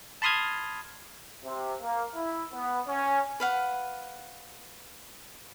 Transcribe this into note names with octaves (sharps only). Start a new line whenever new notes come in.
A5 B5 C6 D#6 F6 G#6
C3
A#3
E4
B3
C#4
B4 F5 F#5